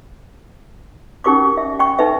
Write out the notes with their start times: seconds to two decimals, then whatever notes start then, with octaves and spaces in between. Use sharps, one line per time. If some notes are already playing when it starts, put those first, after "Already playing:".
1.24 C#4 D#4 G4 A#4 C#6 D6
1.57 E5
1.79 G5 C#6
1.99 D#4 A4 B4 E5